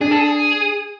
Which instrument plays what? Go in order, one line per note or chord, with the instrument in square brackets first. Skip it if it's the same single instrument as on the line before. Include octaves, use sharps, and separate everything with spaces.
[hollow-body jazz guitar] D4 [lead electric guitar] G#4
[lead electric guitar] A4
G#4